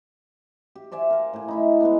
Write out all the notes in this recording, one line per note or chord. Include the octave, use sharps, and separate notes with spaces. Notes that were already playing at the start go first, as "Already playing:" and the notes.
G4
C5 D5 E5 G#5
A#4 F5
A2 G#5
D#4 E4 B5
G#3 B3 D4